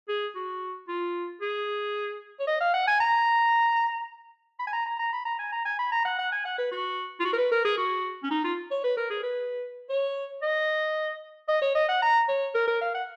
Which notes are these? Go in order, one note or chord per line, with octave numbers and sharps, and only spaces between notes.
G#4
F#4
F4
G#4
C#5
D#5
F5
F#5
G#5
A#5
B5
G#5
A#5
A#5
A#5
B5
A#5
G#5
A#5
G#5
B5
A#5
F#5
F#5
G#5
F#5
B4
F#4
F4
F#4
A#4
B4
A#4
G#4
F#4
C#4
D#4
F4
C#5
B4
A#4
G#4
B4
C#5
D#5
D#5
C#5
D#5
F#5
A#5
C#5
A#4
A#4
F5
F#5